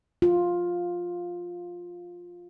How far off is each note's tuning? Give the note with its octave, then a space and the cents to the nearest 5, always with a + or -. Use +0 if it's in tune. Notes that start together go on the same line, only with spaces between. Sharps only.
F4 +10